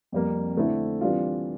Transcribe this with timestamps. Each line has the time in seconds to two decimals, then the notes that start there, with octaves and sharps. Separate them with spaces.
0.12 F2 C3 G3 A#3
0.57 D3 A3 C4 E4 A4
1.01 C3 E3 G3 D4 F4